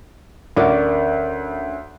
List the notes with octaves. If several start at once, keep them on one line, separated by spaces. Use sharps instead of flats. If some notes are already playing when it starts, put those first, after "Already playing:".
D2 C#4 A#4 D5 F#5